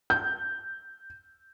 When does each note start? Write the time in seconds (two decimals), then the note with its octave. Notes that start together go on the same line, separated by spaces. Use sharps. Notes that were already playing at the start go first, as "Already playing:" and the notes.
0.10 G6